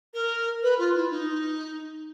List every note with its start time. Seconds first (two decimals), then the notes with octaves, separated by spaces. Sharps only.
0.13 A#4
0.62 B4
0.78 F4
0.95 E4
1.10 D#4